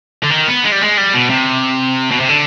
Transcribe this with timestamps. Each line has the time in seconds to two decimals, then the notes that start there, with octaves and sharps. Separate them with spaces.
0.24 D3
0.31 D#3
0.48 B3
0.64 G#3
0.72 G3
0.81 G#3
0.97 G3
1.13 B2
1.30 C3
2.11 B2
2.20 C3
2.29 D3